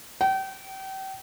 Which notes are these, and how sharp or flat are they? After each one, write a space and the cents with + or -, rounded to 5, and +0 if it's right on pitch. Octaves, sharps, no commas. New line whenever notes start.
G5 -35